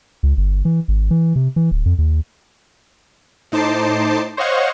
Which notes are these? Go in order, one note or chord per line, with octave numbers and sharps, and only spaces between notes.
C#2
G1
E3
G#1
E3
C3
E3
D1
F2
D#2
A2 D#4 C5 A5 D6 C7
C5 C#5 D#5 F5 F#5 C#6